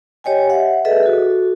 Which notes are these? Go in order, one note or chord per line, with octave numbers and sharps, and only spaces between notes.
G4 C#5 D#5 G5 G#5
E5 F#5
G#4 A4 B4 D#5 E5
F#4 A4